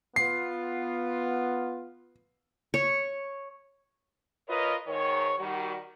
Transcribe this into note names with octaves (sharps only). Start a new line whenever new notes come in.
B3 F4 C7
C#5
F4 A#4 B4 C#5 D#5
G#2 D#3 C#5
D#3 G3 F#4